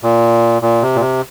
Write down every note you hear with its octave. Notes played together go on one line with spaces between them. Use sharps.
A#2
A#2
C3
A#2
C3